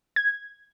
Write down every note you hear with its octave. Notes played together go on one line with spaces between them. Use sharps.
G#6